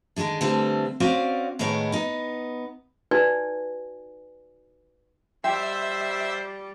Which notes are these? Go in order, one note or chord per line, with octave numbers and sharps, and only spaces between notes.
D3 D#3 F#3 G#3 D4
D3 E3 G3 A3 C4
C4 C#4 F#4 D5 F5
A2 D#3 G#3 B3 A#4 C#5
B3 D#4
D#4 F#4 B4 D5 G#5
G3 G4 C5 E5 C6